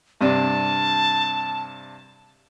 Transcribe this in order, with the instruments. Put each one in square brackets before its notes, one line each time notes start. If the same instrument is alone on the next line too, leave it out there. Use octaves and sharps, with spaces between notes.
[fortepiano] G2 C3 D4 [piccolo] A5